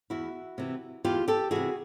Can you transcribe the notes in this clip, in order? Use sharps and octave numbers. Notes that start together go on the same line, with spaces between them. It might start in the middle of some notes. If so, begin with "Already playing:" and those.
E2 E4 F#4
C3 E3
E2 F4 G4
G4 A4
C3 E3 F#4 G#4